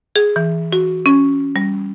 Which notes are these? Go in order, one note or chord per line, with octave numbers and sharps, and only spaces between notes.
G#4
E3
F#4
C#4
G3